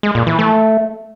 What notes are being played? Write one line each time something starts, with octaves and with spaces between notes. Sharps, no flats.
G#3
A#2
E3
A3